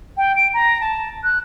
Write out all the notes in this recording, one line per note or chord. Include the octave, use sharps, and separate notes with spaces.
G5
D7
A#5
A5
F#6